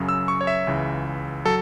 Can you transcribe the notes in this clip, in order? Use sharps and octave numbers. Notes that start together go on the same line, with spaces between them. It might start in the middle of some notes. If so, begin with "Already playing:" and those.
Already playing: F#2 C#3 F#3
E6
C#6
C#5
E5
C#2 C#3 E3
F#3 A4